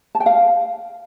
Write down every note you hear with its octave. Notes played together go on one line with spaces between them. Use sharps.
A5
G5
F5